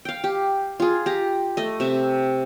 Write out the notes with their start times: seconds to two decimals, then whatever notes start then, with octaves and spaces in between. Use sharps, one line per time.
0.05 F5 G5
0.24 G4
0.80 F4 G#4
1.06 G4 A#5
1.57 A3 D#5
1.80 C3 E5